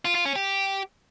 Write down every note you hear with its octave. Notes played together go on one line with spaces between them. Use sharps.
F4
F4
C#4
G4